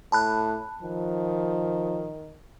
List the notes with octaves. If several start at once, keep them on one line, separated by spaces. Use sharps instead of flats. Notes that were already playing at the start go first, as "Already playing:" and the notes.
A2 A5 B5 F#6
D#3 F3